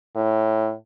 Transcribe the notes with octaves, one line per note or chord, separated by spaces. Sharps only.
A2